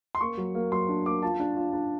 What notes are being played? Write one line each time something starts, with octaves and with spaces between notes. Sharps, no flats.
C6
A#3 C#6
F#3
A#3
F#3 C6
D4
A#3 D6
F4 A5
D4
F4
D4